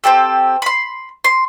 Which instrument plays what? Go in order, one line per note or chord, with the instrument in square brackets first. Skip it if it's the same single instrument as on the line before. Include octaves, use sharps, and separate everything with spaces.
[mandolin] C4 D4 G4 A4
B5 C6
C6